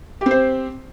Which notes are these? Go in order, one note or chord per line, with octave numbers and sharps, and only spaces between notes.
C4 G4 C5